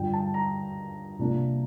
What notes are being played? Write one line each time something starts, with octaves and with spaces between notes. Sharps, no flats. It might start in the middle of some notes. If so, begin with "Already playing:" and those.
Already playing: G2 D3 F3 G5
A5
A#5
C3 F3 A#3 D4